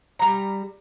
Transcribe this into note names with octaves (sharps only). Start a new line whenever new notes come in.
G3 A#5